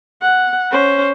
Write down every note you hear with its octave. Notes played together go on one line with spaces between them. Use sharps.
F#5
C#4 C5